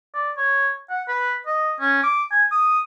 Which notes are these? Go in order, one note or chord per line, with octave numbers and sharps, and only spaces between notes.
D5
C#5
F#5
B4
D#5
C#4
D6
G#5
D#6